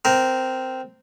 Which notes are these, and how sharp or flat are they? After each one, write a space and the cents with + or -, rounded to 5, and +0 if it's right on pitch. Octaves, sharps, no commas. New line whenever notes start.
C4 -10 A#4 +0